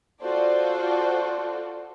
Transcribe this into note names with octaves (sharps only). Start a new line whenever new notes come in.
F4 F#4 A4 C5 D5